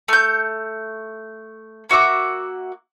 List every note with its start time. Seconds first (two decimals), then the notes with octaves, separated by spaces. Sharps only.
0.08 A3 G6
1.89 A#3 F#4 E5 D6